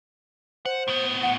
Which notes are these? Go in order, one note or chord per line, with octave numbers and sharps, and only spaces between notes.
C5 F#5
A2 B3
F#5